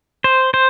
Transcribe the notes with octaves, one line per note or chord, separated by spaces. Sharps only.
C5
C5